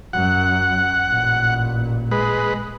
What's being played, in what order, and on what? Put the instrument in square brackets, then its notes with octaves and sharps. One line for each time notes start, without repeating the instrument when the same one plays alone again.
[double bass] F#2 [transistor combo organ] F#5
[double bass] A1 A#2
[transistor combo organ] G#3 B4